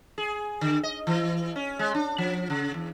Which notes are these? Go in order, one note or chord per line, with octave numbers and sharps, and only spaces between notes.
G#4
D3
D#5
E3
C#4
G#3
D4
F3
C#3
E2